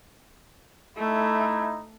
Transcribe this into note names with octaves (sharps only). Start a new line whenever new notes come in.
A3 D#4 E4